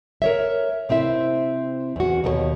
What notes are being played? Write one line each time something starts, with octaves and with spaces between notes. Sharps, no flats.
A#4 C#5 E5
C3 C4 E4 E5
E2 F#4
D#2 B2 A#4 C#5